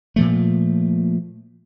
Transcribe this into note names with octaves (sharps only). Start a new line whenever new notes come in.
A#2 F3 A3